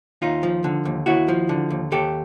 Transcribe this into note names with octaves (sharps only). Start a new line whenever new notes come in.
D#2 D#4 F4
F3
D3
D#2
D#2 E4 F#4
F3
D3
D#2
D#2 G4 A4